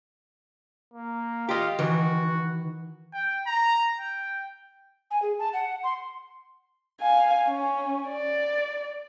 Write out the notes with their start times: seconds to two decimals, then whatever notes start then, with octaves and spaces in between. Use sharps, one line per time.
0.94 A#3
1.49 F4 G4 D#5
1.79 D#3 E3 F#4
3.13 G5
3.47 A#5
3.99 G5
5.11 G#5
5.22 G#4
5.39 A5
5.53 F#5
5.84 C6
7.01 F5 G#5
7.47 C#4
8.09 D5